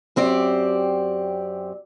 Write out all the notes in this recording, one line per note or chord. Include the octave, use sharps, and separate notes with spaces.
F#2 C4 G4 D5